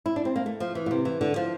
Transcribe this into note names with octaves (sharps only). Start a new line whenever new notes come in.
E4
D4
C4
A#3
A3
F3
E3
A#2
C3
E3
D3
F3